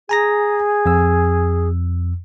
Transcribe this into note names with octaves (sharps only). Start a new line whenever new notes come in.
G#4 G#5 A#5 A#6
F2 E6